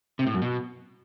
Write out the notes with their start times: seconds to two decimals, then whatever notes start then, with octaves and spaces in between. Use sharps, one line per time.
0.19 C3
0.27 A2
0.34 F#2
0.42 B2